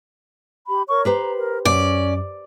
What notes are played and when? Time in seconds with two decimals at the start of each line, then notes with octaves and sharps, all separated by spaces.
0.67 G4 B5
0.88 A#4 C#5 C#6
1.05 G4 B4 C5 A#5
1.38 A#4
1.65 F#2 C#4 D5